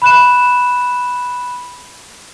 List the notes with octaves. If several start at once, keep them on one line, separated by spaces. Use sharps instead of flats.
B5 F#6 E7